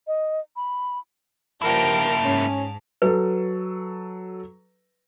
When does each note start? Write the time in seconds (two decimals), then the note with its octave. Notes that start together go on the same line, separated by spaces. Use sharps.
0.07 D#5
0.56 B5
1.62 G2 F3 A#3 E4 A#4 G5 A5 F7
2.24 G#2 C#4
3.02 F#3 A4 B4